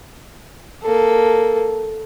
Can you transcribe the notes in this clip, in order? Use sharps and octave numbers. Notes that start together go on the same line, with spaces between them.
A#3 A4